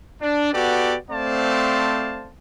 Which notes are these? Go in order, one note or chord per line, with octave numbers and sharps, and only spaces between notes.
D4
B3 F#4 G4 A4 B4 D5
A3 C4 C5 D5 F5 A5